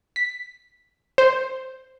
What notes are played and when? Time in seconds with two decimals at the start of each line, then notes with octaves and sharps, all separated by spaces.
0.16 B6
1.18 C5